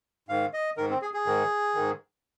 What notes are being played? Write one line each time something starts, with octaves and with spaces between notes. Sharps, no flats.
G#2 D#3 F5
D#5
G#2 D#3 A#4
C4
G#4
G#4
G#2 D#3
G#2 D#3